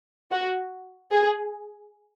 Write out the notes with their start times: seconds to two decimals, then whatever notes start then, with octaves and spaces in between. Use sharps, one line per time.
0.31 F#4
1.12 G#4